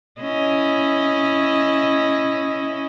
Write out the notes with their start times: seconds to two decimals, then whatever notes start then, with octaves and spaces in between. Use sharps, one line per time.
0.21 C#4 E4 D#5